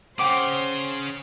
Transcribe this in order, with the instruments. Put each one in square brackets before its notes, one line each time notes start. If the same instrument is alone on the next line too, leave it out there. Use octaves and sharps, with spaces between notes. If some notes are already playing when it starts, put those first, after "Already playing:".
[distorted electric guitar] C#3 [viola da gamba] C5 [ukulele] F#5 G5 [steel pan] D6